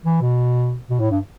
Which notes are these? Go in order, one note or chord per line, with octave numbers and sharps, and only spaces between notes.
E3
B2
B2
A2
G2